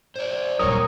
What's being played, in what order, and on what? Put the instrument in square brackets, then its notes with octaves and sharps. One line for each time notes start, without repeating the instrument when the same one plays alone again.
[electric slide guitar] C5 D5
[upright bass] D#1 D#4 [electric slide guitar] F#3 G3 A#3 [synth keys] A#4 C#5 [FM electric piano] D#6